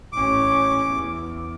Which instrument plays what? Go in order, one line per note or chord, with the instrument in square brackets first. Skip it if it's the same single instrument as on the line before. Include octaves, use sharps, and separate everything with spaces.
[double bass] A1 C#4 [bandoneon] D6
[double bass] E2